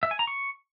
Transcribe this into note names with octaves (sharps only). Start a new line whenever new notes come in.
E5
G#5
A#5
C#6